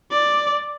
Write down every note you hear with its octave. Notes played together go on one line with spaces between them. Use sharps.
D5